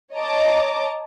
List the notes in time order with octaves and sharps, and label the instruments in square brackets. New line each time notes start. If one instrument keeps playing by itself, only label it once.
[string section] C#5 D#5 A5 A#5 D6